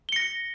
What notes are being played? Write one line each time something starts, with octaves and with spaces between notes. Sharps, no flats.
A#6 C#7 G7